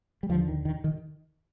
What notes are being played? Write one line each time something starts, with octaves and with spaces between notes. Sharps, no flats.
G3
D#2 D3 F3
D#3
D#3
D#3